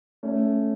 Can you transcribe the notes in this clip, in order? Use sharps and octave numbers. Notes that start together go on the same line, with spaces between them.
A3 C#4